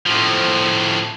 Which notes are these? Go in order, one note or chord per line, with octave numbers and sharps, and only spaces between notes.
A2 F3